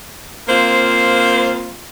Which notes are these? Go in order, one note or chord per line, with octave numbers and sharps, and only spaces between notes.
A#3 C4 F4 C5